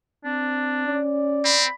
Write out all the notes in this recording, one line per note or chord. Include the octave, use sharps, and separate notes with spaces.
C4 D4
C#4 D5
C4 B5